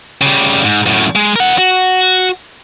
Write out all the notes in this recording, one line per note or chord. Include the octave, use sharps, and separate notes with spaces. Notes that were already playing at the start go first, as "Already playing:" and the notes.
C#3 G3
G#2
F#2 A2
G#3
A#4 F#5
F#4